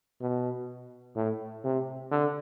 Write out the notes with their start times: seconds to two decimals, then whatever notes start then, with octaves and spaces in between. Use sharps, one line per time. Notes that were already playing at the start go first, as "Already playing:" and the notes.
0.21 B2
1.16 A2
1.64 C3
2.11 D3